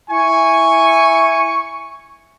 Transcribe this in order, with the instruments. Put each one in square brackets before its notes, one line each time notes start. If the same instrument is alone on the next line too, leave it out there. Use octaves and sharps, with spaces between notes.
[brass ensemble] E4 G#5 [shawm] C#6